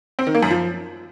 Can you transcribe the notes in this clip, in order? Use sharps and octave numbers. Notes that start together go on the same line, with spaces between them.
C4
D#3
A#3
F#2
F3